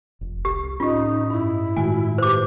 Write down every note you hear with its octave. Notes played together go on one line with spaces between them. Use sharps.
F1
C2 G4
A2 C#4 D#4 F4 G4
G2 E4
A2 D#3 G#3 A3 F4 F#4 G#5
G4 B4 C5 D6